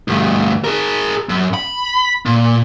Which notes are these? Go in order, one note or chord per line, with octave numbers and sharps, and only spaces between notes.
D2 G2
G#4 A#4
F#2
B5
A#2